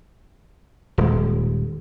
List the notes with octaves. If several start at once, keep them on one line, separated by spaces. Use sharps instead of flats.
D#1 G#3